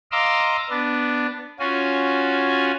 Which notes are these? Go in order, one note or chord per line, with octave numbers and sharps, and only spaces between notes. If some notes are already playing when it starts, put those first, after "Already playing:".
D#5 F5 A#5 C6 D6 E6
B3 D4
C#4 F4 F#4 G#5